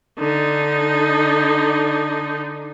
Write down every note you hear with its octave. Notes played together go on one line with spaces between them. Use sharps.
D3 D#4